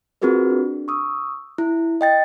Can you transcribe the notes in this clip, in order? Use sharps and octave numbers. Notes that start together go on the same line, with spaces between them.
C4 F4 F#4 G#4 A#4 B4
D4
C#6 D#6 E6
E4
D#5 G5 A6